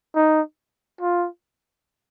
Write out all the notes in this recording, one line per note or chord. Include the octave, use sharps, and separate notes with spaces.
D#4
F4